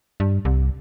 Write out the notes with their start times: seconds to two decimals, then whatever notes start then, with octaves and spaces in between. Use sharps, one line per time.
0.20 G2
0.45 C2